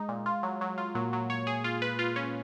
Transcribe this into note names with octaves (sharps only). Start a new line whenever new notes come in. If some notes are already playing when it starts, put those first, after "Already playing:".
Already playing: G#3 D#4
A#2
F4
F#3
F#3
F4
A#2 F#3 A#3
F#3
C#5
G#4
F4
B4
F4
C#4